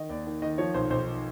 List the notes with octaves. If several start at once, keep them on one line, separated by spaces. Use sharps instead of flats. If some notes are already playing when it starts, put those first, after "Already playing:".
Already playing: D#3 D#5
D#2 D5
D#3
D#3 D#5
F3 C#5
B1 C5
B1 C5